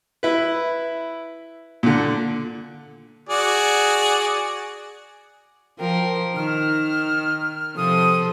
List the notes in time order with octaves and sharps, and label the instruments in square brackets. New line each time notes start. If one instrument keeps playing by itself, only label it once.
[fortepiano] E4 B4
A#2 D3
[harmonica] F#4 G#4 D5
[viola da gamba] F3 A#4 [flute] G5
[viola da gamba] D#3 [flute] F6
[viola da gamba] C3 F3 A4 [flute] D#6